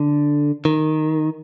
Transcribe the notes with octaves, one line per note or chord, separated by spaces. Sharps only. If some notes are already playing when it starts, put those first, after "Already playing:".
Already playing: D3
D#3